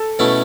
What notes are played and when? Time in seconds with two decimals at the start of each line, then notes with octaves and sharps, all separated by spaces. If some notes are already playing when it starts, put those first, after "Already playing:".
Already playing: A4
0.19 B2 A3 C#4 E4